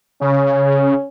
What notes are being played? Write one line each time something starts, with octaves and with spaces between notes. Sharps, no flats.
C#3 C#4